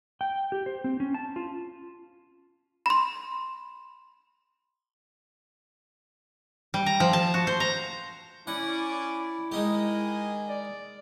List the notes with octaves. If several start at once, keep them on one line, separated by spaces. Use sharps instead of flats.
G5
G4
C5
C4
C#4
A5
F4
B5 C6
G3
A#5
F3
A5
F#4
C5
A#5
C#4 E4 D5 F#5
E4
D#3 G#3 D#4 G4 G#4 D#5
D5